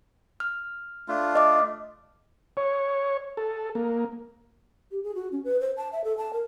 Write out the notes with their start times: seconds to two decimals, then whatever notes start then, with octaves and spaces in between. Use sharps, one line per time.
0.40 F6
1.08 A3 D4 F4
1.35 D#5 D6
2.57 C#5
3.37 A4
3.75 A#3
4.91 G4
5.03 G#4
5.15 F#4
5.32 C#4
5.44 B4
5.61 C5
5.77 A5
5.93 E5
6.04 A4
6.18 A5
6.33 A#4